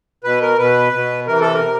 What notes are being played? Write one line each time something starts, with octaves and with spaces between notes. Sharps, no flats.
B2 B4
A#4
B2 B4
B2
C3 E3 A#4
A4
A#4
C3